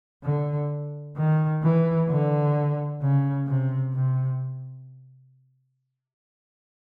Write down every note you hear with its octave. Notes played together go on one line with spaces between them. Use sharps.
D3
D#3
E3
D3
C#3
C3
C3